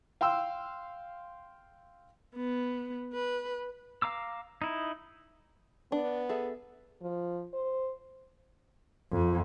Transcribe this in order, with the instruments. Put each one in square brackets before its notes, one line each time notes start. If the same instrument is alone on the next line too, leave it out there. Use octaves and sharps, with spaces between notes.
[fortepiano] F5 G5 C6 E6
[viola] B3
B4
[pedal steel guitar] F5 A#5 D6 E6
D#4 E4
[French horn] B3 [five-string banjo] D4
[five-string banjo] G#4 A4 E5
[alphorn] F3
C5
[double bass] F2